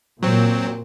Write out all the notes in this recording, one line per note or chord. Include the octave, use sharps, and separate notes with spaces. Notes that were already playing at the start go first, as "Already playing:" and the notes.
A#2 F#3 C4